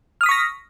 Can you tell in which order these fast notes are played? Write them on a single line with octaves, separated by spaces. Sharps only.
F6 D#6 B6 C#6 A#6